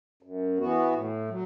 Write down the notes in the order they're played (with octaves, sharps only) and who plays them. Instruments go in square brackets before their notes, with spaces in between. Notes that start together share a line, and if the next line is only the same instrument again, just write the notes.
[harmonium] F#2
E3 B3 F#4
A2
F#3